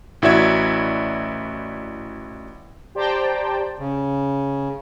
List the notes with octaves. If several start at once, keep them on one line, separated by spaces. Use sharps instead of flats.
A1 E4 F#4 D5 E5 G#6
G4 C5 D5 G5 A5 A#5
C#3